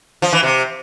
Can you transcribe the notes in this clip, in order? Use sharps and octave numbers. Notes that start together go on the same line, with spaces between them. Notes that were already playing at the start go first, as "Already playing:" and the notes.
F3
E3
C3